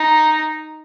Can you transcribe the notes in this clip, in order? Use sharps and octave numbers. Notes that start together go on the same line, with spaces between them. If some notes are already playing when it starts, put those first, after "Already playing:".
Already playing: D#4